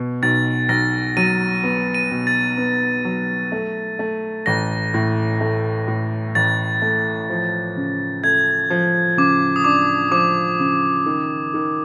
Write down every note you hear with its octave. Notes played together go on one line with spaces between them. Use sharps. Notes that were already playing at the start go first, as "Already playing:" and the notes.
Already playing: B2
B1 A6
B1 A#6
F#3 D#7
B3
D#7
B2
A6
B3
F#3
A3
A3
A1 A#6
A2
A3
A2
A1 A6
A3
F3
C#3
A3 G#6
F3
C#3 D6
D#6
D4 D6
F3 D6
C#3
D#3
D#3